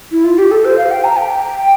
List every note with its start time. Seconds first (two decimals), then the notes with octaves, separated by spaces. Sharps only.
0.12 E4
0.25 F4
0.38 G4
0.51 A4
0.65 C5
0.78 F5
0.91 G5
1.04 A#5
1.18 G5